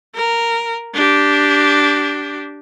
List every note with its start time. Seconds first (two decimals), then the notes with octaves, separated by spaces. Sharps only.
0.15 A#4
0.94 D4 G4